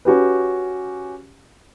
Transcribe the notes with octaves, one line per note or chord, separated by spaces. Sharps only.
C#4 F#4 G4 B4